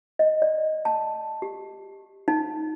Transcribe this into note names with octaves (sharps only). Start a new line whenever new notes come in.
D#5
D5
A5
G4
D#4